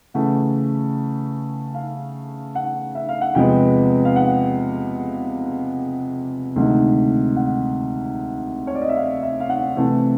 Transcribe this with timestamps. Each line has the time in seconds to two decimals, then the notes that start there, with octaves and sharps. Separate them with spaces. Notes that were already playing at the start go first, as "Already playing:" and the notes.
0.14 C#3 E3 A3 F#5
1.74 F5
2.55 F#5
2.95 E5
3.09 F5
3.21 F#5
3.35 E2 C3 F3 G#3 B3 G5
4.05 F5
4.16 F#5
6.56 D2 C3 D#3 G#3
7.36 F#5
8.67 C#5
8.75 D5
8.82 D#5
8.89 E5
8.96 F5
9.23 E5
9.40 F5
9.49 F#5
9.76 C3 E3 A3 C4